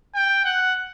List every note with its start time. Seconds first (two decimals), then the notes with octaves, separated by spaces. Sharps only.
0.15 G5
0.45 F#5